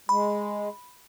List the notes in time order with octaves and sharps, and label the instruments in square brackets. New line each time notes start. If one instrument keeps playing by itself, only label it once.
[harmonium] G#3 [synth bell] B5